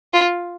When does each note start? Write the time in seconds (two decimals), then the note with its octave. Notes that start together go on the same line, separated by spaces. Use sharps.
0.13 F4